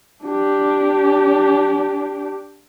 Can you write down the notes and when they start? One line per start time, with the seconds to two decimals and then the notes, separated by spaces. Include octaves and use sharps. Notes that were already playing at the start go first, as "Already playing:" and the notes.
0.24 D4 G4